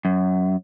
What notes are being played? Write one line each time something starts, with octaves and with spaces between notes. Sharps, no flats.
F#2